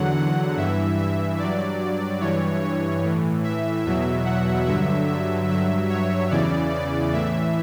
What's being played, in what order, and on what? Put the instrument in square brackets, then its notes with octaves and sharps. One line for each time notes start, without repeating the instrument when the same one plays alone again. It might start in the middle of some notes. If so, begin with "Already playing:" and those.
Already playing: [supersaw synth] E2 D3 F#3 F#5
F#5
G2 E3 E5
E5
G2 F#3 D5
G2 E3 C#5
C#5
A2 E3
E5
E2 B2 F#3 E5
F#5
G2 D3 F#3 E5
E5
G2 F#3 E5
C#5
E2 C#3 E3 D5
D5
A2 E3 E5